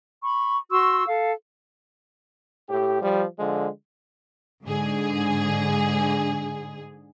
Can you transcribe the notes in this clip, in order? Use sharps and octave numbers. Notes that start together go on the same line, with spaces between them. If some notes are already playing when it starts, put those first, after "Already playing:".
B5 C#6
F#4 C6 C#6 E6
A4 F5
A2 G4
F3 G3
D3 F3 G#3
G#2 D3 G#4